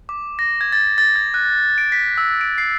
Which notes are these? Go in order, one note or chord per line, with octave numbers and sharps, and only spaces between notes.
D6
A#6
G#6
A6
A6
G#6
F#6
D7
B6
E6
D7
C7